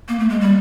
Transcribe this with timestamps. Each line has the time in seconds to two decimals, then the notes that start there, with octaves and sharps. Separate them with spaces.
0.09 A#3
0.19 A3
0.30 G#3
0.41 G3